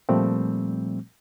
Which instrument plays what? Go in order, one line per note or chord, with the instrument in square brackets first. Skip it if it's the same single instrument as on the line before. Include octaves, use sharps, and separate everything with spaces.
[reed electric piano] A#2 F3 G3 A3 C4